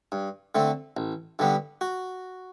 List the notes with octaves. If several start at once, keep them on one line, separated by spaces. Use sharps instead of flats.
G2
D3 A3 C4
A1
G2 D3 G3 B3
F#4